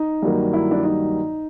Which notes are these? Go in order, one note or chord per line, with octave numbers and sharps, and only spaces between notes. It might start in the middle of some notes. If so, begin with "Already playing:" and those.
Already playing: D#4
G2 D#3 F#3 A#3
E4
D4
D#4